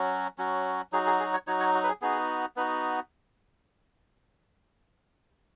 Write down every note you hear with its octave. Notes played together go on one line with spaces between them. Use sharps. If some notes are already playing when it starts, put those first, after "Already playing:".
Already playing: F#3 C#4 F#4
F#3 C#4 F#4
F#3 D#4 F#4 G#4
G#4
G#4
C#5
F#3 D#4 F#4 C#5
C#5
F#4
B4
G#4
B3 D#4 F#4 G#4
B3 D#4 F#4 B4